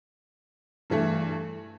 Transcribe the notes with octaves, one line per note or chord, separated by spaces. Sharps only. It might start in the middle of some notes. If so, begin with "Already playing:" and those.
G2 E3 A3